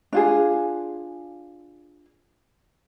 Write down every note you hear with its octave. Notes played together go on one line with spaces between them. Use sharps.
D4 F4 G#4